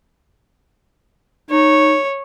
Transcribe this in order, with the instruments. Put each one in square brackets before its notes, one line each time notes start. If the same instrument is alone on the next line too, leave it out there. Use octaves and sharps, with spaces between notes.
[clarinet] D#4 [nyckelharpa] C#5